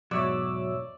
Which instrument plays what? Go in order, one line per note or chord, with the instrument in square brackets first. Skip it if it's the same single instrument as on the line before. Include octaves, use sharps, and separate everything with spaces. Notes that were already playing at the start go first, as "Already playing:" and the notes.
[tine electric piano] E2 G#2 B2 [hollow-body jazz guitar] F#3 [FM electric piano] C#5 E5 E6 [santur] D5